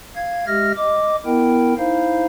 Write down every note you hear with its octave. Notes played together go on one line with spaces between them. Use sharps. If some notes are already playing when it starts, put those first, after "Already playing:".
F5 G#6
G#3 G4 E5 F6 A#6
D#5 D6
B3 E4 A#4 G5
D#4 E4 C5 F5